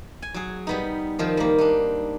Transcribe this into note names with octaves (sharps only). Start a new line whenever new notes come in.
G#5
F#3 G#4
G3 B3 D#4
D#3 F3 C4
G3 A#3
D4 D#4